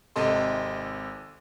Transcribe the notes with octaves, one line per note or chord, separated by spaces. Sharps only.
G#1 C3 A4 D#5 C6